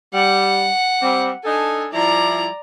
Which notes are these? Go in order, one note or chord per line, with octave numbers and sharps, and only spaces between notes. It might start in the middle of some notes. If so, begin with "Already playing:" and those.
G3 F#5
G3 C4
D4 D#4 A4 G#5
F3 G3 E4 D5 A#5